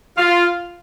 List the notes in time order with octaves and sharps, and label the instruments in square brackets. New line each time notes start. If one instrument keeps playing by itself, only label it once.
[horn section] F4